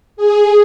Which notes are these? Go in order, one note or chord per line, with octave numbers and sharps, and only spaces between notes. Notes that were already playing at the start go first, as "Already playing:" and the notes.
G#4